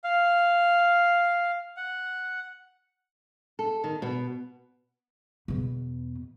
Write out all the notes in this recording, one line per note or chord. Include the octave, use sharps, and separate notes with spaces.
F5
F#5
A4
D#3
B2
E2 B2